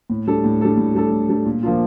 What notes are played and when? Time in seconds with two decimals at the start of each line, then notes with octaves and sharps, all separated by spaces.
0.10 A2
0.27 G3 D4 A4
0.44 A2
0.61 G3 D4 A4
0.77 A2
0.95 G3 D4 A4
1.12 A2
1.29 G3 D4 A4
1.45 A#2
1.63 F3 A#3 D4 F4